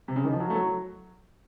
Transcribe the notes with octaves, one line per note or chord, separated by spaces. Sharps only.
C3
C#3
D#3
F3
F#3
A3
F#3